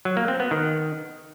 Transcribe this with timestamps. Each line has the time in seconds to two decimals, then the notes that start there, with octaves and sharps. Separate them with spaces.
0.05 F#3
0.17 A#3
0.28 C4
0.40 B3
0.51 D#3